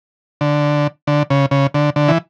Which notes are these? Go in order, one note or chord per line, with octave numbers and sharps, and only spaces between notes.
D3
D3
C#3
C#3
D3
D3
E3